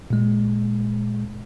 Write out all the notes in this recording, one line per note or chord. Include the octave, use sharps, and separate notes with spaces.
A#2 G#3